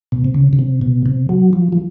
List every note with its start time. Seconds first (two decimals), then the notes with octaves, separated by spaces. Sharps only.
0.12 B2
0.24 C3
0.34 C#3
0.53 C#3
0.59 C3
0.81 B2
1.06 C3
1.29 F#3
1.53 F3
1.72 F3